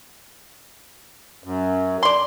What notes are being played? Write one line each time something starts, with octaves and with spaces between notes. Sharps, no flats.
F#2
D5 C6